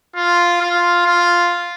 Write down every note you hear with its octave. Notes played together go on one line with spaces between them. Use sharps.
F4
F4
F4